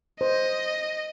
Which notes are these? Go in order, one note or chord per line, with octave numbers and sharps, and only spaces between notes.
C5 D#5